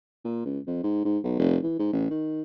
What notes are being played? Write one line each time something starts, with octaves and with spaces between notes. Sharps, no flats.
A#2
C#2
F2
G#2
G#2
B1
F1
E3
G#2
A1
D#3